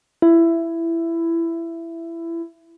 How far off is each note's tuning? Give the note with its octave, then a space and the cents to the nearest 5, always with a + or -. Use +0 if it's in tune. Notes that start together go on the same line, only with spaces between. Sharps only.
E4 +15